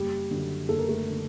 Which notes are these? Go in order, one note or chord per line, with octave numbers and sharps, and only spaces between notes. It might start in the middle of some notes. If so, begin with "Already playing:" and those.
Already playing: F#1 G3 G4
F#2 D3
F#1 A4
A#4
A3 A4
D3